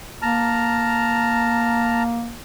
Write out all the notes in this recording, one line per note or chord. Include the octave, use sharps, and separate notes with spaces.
A#3 A5 A#5 F6